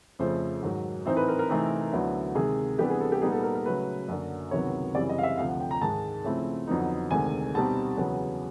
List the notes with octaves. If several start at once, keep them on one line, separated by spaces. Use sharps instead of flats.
F2 C#3 F3 A3 C5
G#2 D#3 F#3
A2 E3 A3 C4 D#4 C5
B4
A#4
A#4
C3 E3 A3 C4 D#4
D2 D3 F#3 B3 E4
C3 D#3 G#3 G#4
C3 E3 G3 B3 D4 G4
G#4
A4
G4
A#2 G3 B3 D#4 G#4
A4
A#4
A#4
C#3 F#3 A3 B4
F#2 D3 F#3 A#3 D4
C#2 C3 D#3 F#3 B3 C#5
F#2 C#3 E3 G3 C4 D5
D#5
F5
E5
D2 C3 F3 F5
F#5
G5
A#5
G#2 D#3 G#3 A5
C#3 F3 A3 C4 E4
F2 D3 F#3 B3 D#4
D2 C3 D#3 G#3 G#5
B2 G3 C4 D#4 A5
E2 C#3 F#3 B3